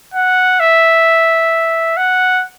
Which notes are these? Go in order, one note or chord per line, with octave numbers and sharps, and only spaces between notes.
F#5
E5
F#5